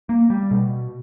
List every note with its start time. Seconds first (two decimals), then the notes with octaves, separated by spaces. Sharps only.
0.09 A#3
0.30 G3
0.51 B2